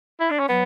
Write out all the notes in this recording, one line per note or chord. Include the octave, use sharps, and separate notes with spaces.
E4
D4
C#4
F#3 B3